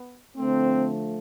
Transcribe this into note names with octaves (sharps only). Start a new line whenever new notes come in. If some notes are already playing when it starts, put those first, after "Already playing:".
Already playing: B3
D3 F3 A3 C4